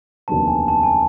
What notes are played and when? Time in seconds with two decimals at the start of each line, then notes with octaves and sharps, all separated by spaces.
0.28 F1 D#2 D3 F#3 B3 A5
0.48 G#5
0.68 A5
0.83 G#5
0.87 A5